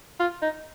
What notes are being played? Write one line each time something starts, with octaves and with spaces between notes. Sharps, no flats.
F4
D#4